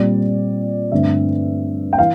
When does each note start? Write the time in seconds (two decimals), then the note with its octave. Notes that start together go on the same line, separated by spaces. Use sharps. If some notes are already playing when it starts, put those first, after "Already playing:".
Already playing: A#2 G3 C4 D5
0.92 G2 D3 A3 C4 E5
1.93 G5
1.98 E3 F5